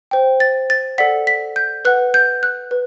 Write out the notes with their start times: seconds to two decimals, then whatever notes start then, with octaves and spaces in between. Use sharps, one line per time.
0.11 C5 G5
0.40 A6
0.70 A6
0.98 A4 D5 F#5 B6
1.27 B6
1.56 G6
1.85 B4 F#5 F#6
2.14 G6
2.43 F#6
2.71 B4